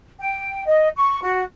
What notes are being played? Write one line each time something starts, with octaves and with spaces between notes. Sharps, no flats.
G5
D#5
C#6
F#4